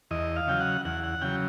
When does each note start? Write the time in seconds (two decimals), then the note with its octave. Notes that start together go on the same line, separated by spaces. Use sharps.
0.11 E2 D#5
0.36 F5
0.48 C#3 F#3 G5
0.60 F#5
0.85 E2 F#5
1.04 F#5
1.22 C#3 F#3 G5